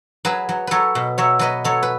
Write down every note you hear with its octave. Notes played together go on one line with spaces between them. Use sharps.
F#3 G#4 B4
F#3
F#3 A4 B4 C#5
B2
F#3 C#5 E5
F#3 B4 D#5
F#3 A4 C#5
B4